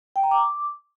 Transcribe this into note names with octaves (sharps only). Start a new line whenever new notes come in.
G5
A#5
D6